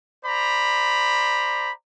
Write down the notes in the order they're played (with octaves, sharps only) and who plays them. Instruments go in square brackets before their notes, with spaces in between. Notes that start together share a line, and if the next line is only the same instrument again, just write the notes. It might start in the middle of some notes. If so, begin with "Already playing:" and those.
[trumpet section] C5 D5 A#5 B5